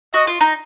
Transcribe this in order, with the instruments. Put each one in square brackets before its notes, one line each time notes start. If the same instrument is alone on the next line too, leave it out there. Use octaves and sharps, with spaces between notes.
[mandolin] F#4 [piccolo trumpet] D#5
[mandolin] F4
D#4